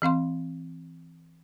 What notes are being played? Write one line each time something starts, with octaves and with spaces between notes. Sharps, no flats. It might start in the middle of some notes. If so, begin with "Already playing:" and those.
E3 C4 F5 C6